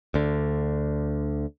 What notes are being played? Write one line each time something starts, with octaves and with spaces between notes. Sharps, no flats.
D2 D3